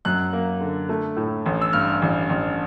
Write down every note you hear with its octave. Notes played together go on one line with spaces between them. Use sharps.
F#2 F#6
A#3
D3
A3
A2
A1
E6
G2 F6
A1
A1